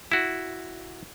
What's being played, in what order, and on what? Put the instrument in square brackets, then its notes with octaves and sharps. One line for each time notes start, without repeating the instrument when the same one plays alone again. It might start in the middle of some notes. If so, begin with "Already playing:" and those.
[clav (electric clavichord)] E4 F#4